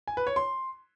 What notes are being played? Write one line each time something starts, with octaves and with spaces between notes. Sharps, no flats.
G#5
B4
C#5
C6